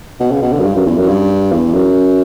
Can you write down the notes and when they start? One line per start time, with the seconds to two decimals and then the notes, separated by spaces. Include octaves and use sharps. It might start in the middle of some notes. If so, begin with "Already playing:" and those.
0.20 B2
0.32 C#3
0.42 B2
0.53 D3
0.59 F#2
0.64 G2
0.75 F#2
0.86 E2
0.98 F#2
1.08 G2
1.52 E2
1.74 F#2